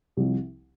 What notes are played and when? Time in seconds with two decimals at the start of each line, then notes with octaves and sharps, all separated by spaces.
0.17 C2 C3 F3